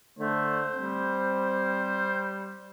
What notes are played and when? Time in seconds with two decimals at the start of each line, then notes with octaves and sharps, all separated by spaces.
0.19 D3 A3 C5
0.74 G3 C4